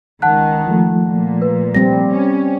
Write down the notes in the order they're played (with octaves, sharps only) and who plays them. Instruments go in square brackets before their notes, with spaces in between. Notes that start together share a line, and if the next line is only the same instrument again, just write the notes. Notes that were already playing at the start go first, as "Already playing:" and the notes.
[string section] C#2 D#3 [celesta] F#5 A5 F#6
[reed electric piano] F3 A3
[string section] A#2
[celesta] B4
[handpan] G3 C4 [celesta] A#6
[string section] C#4